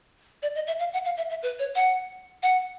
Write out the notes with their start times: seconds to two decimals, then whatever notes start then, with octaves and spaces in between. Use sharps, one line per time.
0.42 D5
0.55 D#5
0.67 E5
0.79 F5
0.93 F#5
1.05 F5
1.17 E5
1.29 E5
1.43 B4
1.59 C#5
1.75 F#5
2.43 F#5